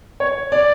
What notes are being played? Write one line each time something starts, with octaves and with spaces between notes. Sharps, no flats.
C#5
D5